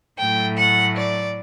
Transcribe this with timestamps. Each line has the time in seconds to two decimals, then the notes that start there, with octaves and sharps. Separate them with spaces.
0.18 A2 F#3 A3 G5
0.57 F#5
0.97 D5